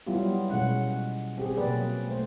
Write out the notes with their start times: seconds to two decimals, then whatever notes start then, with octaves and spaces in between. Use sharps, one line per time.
0.07 F#3 G3 B3 E4 F4 G4
0.49 B2 G#3 C#4 F#5
1.38 C4 G4 G#4
1.57 B2 F#3 A#3 B4 D5
2.07 A3 C5